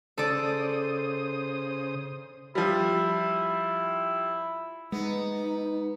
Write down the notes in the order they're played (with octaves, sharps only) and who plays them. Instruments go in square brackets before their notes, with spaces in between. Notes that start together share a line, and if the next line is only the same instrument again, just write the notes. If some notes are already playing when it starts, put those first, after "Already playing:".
[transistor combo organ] C#3 C5 D#6 [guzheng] A4 D5
[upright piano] F3 G3 [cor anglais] E4
[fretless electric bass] G#3 [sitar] B3 [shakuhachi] D#4